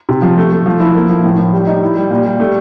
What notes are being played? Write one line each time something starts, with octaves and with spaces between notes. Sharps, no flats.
C3
F3
A3
A3
F3
E4
A#3
F3
A2
A2
G3
D#4
E4
G3
A#2
G3
A3